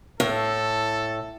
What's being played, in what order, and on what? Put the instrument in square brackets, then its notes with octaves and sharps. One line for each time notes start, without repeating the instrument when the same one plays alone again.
[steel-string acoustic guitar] A2 [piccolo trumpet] A4